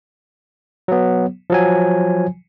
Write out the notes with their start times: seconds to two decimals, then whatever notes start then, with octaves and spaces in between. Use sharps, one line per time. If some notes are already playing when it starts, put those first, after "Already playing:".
0.88 F#3 B3
1.50 F3 F#3 G#5